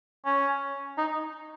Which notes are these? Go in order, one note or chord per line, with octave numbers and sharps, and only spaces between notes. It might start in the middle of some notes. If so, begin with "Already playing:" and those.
C#4
D#4